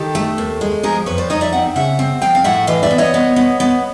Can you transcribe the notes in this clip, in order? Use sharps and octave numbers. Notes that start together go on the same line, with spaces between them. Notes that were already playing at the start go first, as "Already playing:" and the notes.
Already playing: D#3 G4 A4
A3
D#2
G#3
F3 G#4 A#4
F2 B4 C#5
C5 D5
D#4 C#5 D#5
D5 E5
C4 E5 F#5
C#3 E5 F#5
C4
F3 F5 G5
F5
A2 E5 F#5
E3 D#5 F5
D5 E5
B3
C#5 D#5
B3
B3
B3